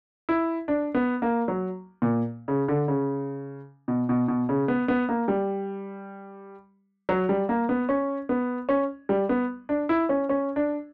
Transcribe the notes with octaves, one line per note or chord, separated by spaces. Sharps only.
E4
D4
B3
A#3
F#3
A#2
C#3
D3
C#3
B2
B2
B2
C#3
B3
B3
A#3
G3
F#3
G3
A#3
B3
C#4
B3
C#4
G3
B3
D4
E4
C#4
C#4
D4